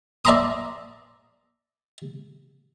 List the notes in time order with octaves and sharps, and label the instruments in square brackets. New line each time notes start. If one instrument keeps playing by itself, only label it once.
[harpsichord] D5 E5 A5 A#5 C6 D#6